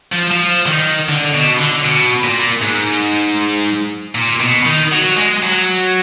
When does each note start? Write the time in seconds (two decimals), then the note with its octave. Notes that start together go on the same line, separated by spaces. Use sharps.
0.13 F3
0.32 F3
0.66 D3
0.70 D#3
1.09 D3
1.34 B2
1.60 D3
1.85 B2
2.23 A#2
2.61 G#2
4.15 A#2
4.40 B2
4.66 D#3
4.92 F#3
5.17 G#3
5.43 F#3